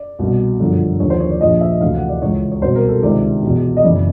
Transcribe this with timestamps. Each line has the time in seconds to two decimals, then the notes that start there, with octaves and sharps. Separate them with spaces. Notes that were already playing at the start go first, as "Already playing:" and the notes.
Already playing: D5
0.19 C2 B2
0.59 G1 F#2 D3 F3
1.00 D#2 D3 F3 C#5
1.10 C5
1.20 C#5
1.30 D5
1.41 A#1 A#2 F3 D#5
1.61 E5
1.81 D2 C3 E3 F5
1.95 F#5
2.08 D5
2.22 C#2 C#3 E3 C#5
2.52 C#5
2.62 C2 B2 C5
2.75 A#4
2.89 A4
3.02 C#2 C3 D#3 D5
3.42 E2 B2
3.77 D#5
3.83 F#1 F#2 C#3 E3 D5